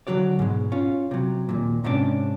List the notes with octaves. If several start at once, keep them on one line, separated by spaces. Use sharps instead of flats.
D3 F#3 F#4 C#5 D5
G#2 B2 G#3
C#4 F4
C3 F#3
D#2 A#2
G#2 C3 C#4 D4 F#4 D5